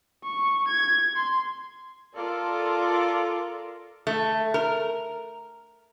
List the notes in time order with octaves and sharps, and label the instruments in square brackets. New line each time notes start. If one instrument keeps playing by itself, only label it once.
[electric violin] C#6
G#6
C6
[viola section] F4 A4 A#4 D5
[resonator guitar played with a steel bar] A3
A#4